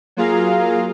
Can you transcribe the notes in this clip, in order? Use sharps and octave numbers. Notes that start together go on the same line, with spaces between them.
F#3 A#3 F4 G#4 F5 A#5